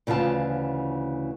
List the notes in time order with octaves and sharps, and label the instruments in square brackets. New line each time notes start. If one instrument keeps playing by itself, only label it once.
[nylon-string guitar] D2 C#3 E3 F4 A5